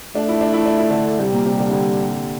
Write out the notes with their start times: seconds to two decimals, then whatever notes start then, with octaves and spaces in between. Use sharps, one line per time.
0.15 A3 D4
0.28 E4
0.41 D4
0.53 E4
0.66 D4
0.78 E4
0.90 D3 D4
1.19 C3 G3 C4
1.32 A#2 A#3
1.45 C3 C4
1.58 D3 D4
1.71 D3 D4